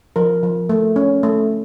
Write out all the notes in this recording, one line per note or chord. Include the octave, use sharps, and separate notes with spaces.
F3 A#4
F3
A3
C#4
A3